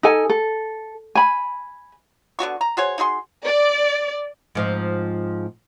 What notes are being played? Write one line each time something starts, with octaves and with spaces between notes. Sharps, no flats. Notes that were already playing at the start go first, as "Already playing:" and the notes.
D#4 A4 G#5
A4
G#5 B5
D3 B3 F#4 C#6
A#5
F#4 G#4 C5 C#5
D#4 F#4 G#4 C6
D5
G#2 F3 C4